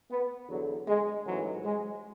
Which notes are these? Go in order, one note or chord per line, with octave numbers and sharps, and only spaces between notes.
B3
E2 D3 F#3
G#3
A1 G#2 E3 F#3
G#3